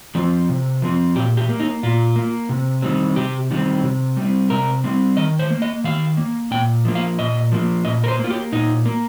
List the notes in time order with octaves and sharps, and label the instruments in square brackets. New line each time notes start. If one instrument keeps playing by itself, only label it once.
[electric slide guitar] F3 C4
C3
F3 C4
A#2 G4
G4
A#3
D#4
A#2 F4
A#3
C3
D#3 G3 C4
C3 G4
D#3 G3 C4
C3
G3
C4
C3 A#4
G3 C4
D#3 D#5
C5
A#3
D#5
D#3 F5
A#3
A#2 G5
F3 A#3
F5
A#2 D#5
F3 A#3
A#2 D#5
A#4
C5
A#3 F4
G4
A#2 D#4
A#3